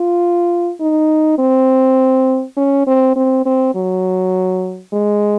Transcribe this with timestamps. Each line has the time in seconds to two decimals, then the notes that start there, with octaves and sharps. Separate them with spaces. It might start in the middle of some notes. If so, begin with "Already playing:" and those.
Already playing: F4
0.81 D#4
1.38 C4
2.57 C#4
2.87 C4
3.16 C4
3.46 C4
3.75 F#3
4.93 G#3